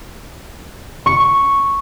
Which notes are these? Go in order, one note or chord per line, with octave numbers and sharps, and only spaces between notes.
C#6